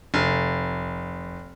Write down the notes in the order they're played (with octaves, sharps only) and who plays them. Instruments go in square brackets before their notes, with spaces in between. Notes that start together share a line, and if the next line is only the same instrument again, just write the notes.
[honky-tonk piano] F1